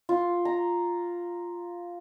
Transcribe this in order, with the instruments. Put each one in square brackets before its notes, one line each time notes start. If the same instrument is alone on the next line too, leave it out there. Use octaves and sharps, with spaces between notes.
[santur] F4
A#5